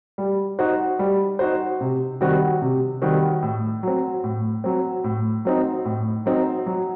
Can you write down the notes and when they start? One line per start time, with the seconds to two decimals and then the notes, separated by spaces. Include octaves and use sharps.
0.18 G3
0.59 D#4 F#4 C5
0.99 G3
1.39 D#4 F#4 C5
1.81 C3
2.21 D#3 G3 C4 F#4
2.62 C3
3.02 D#3 G3 C4 F#4
3.42 A2
3.83 F#3 C4
4.24 A2
4.64 F#3 C4
5.04 A2
5.45 F#3 C4 D#4
5.85 A2
6.26 F#3 C4 D#4
6.66 F#3